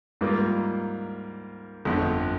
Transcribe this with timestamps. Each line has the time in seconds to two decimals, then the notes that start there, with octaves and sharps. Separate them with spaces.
0.21 G#2 G3 A#3 F4
1.85 G1 F2 D3